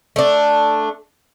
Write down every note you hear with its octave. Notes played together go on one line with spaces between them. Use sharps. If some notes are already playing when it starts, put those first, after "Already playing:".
A3 D4